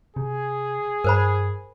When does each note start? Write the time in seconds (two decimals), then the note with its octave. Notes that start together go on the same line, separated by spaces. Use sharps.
0.16 C3 G#4
1.04 G2 A#4 C5 B5